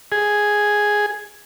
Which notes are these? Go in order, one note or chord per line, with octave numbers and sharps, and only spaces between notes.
G#4